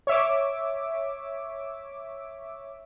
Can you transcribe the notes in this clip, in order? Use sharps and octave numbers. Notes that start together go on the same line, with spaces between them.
C#5 E5 D6